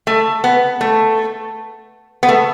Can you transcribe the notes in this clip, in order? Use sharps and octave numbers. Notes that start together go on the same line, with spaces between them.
A3
B3
A3
B3
A3